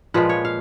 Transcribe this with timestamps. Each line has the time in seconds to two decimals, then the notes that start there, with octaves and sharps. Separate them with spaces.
0.14 A#2 F3 G#3 B4
0.29 C#5
0.45 F5